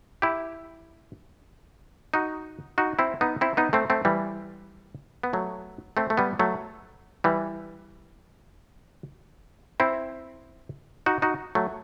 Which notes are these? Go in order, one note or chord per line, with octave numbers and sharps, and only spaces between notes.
E4 G4
D#4 F#4
D#4 F#4
C4 E4
B3 D#4
C4 E4
B3 D#4
A3 C4
A3 C4
E3 G3
B3
F#3 A3
A3 C4
A3
G3 B3
F#3 A3
E3 G3
C4 E4
D#4 F#4
D#4 F#4
F#3 A3